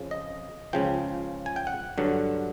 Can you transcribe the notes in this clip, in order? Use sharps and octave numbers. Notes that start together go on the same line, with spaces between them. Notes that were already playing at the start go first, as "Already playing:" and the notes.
Already playing: F2 C#3 F3
D#5
C#2 C#3 F3 G5
G#5
G5
F#5
G2 D3 F#3